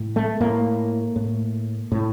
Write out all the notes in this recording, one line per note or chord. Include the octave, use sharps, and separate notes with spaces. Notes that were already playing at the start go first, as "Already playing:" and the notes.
Already playing: A2
A3
A2 A#3
A2
A2